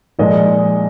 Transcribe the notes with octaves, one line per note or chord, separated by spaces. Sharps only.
A#2 F3 G#3 D#4 D#5